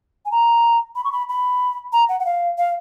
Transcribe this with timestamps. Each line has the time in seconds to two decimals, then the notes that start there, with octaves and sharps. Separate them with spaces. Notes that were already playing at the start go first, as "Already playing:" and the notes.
0.25 G#5
0.31 A#5
0.96 B5
1.04 C#6
1.12 B5
1.29 B5
1.93 A#5
2.09 F#5
2.20 F#5
2.25 F5
2.58 F5